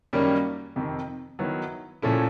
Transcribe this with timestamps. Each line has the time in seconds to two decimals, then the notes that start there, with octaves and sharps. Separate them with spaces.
0.13 F#2 D#3 G3 A#3 C#4
0.76 F2 C3 D#3
1.39 D#3 F#3 B3 E4
2.02 A#2 F3 A3 C#4 E4